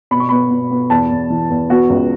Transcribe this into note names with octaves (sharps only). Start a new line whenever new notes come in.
B2 B5
C#6
B3 B5
B2
B3
E2 A5
E2
E3
E2
B3 F#4
C#2